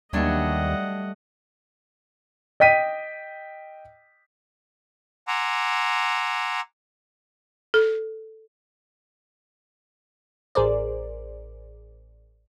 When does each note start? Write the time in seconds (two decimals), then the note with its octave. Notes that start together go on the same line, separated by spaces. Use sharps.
0.13 D#2 F#3 G3 A3 D4 D#5 F#5
2.60 D#5 G5 B6 D#7
5.28 F#5 G#5 A#5 C6 D6 E6
7.74 A4
10.55 A1 G#4 A#4 C5 D5